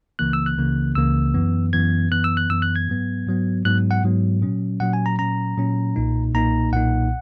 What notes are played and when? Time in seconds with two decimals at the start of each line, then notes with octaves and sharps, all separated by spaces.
0.19 C#2 C#3 E3 A#3 F#6
0.33 E6
0.46 F#6
0.58 C#2 C#3 E3 A#3
0.95 C#2 C#3 E3 A#3 E6
1.34 F#2 E3 B3
1.73 F#2 E3 B3 G#6
2.11 F#2 E3 B3 F#6
2.24 E6
2.37 F#6
2.50 F#2 E3 B3 E6
2.62 F#6
2.76 G#6
2.88 G#2 F#3 B3
3.27 G#2 F#3 B3
3.65 G#2 F#3 B3 F#6
3.91 F#5
4.04 G#2 F#3 B3
4.42 A#2 F#3 C#4
4.80 A#2 F#3 C#4 F#5
4.93 G#5
5.06 A#5
5.19 A#2 F#3 C#4 A#5
5.57 A#2 F#3 C#4
5.96 B1 A#2 A#3 D#4
6.34 B1 A#2 A#3 D#4 A#5
6.72 B1 A#2 A#3 D#4 F#5